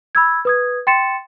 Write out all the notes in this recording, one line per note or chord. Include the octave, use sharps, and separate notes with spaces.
B5 E6 G#6
B4 D#6 G#6
G5 C6 A6 C#7 E7